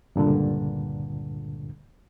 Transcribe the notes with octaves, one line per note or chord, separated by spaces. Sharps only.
C#2 G2 A#2 D3